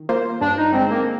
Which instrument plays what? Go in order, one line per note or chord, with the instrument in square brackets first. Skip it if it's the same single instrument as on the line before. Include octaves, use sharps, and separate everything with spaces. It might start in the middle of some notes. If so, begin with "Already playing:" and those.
Already playing: [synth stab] D#3
A#3 F4 C5
[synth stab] G2 [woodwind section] D4
[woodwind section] D#4
[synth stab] D3 G#3 [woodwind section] C4
[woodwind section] A#3